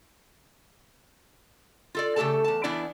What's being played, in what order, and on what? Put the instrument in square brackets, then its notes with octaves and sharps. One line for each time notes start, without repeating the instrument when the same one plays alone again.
[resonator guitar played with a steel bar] F4 A4 D5
C#3 A3 A#3 G4 A4 A5
E2 A5
E2 E3 B3 D4 E4 D5